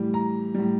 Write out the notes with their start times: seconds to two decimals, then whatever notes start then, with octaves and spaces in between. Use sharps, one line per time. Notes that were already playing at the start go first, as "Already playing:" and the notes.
Already playing: A2 E3 G3
0.14 A#5
0.54 A2 G3